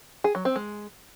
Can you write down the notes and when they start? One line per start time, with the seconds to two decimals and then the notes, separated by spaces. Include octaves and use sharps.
0.24 G#4
0.35 F#3
0.45 C4
0.56 G#3